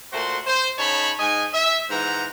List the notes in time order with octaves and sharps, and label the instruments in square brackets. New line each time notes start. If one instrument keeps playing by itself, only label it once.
[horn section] A#2 A3 F#4 C5 C6
C5
C#3 D#4 C#5 A5 B5
G#2 D#5 G#5
E5
G#2 E3 C5 F#5 A#5